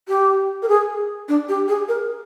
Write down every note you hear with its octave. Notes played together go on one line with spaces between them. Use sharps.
G4
A#4
G#4
D4
G4
G#4
A#4